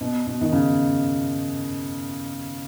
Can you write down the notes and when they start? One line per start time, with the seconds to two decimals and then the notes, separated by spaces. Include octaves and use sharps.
0.01 B2
0.27 B2
0.41 D#3
0.52 C#3